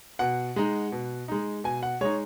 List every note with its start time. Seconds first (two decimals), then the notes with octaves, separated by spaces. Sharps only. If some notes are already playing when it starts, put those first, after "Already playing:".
0.19 B2 F#5
0.56 G#3 D#4
0.92 B2
1.28 G#3 D#4
1.64 B2 G#5
1.83 F#5
2.01 G#3 D#4 C#5